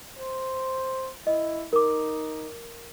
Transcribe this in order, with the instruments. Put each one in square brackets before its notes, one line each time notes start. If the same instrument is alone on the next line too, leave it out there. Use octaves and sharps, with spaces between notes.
[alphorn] C5
[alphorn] E4 [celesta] D#5
[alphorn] D#4 [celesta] A#4 D6